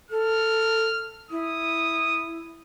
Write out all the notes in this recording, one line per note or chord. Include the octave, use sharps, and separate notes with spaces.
A4 F6
E4 D#6